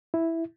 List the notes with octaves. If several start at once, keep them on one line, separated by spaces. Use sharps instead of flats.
E4